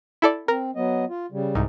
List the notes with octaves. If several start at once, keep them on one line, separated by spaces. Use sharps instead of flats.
E4 A4 D5
C4 A#4
F#3 B3 D#5
F4
C#3 G3
C2 G#2